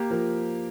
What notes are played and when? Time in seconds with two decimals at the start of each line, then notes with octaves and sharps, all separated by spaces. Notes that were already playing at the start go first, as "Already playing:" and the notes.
Already playing: A#3 G4
0.10 F3 A#4